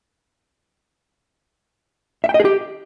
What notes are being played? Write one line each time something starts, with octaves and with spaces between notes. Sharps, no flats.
E5
G5
D#5
G#4
G4